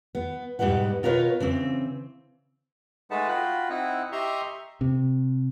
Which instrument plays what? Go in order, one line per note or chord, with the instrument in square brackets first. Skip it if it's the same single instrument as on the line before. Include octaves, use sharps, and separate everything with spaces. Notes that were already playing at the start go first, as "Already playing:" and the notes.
[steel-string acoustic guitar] B3
G#2 B2 G3 B4 F#5
B2 F4 A#4 B4 C#5
C#3 E3 C4
[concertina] G#3 A3 D#4 B4 F#5 A5
F4 F#4 G5 B5
C4 D#4 E4 F#5
G4 D#5 E5 A#5 C6 C#6
[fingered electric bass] C3